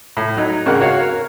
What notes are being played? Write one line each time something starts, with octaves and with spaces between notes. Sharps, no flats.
A2
F#3 D#4
G#1 C#3 A#4 F#5
F#4 C#5 F5
A#4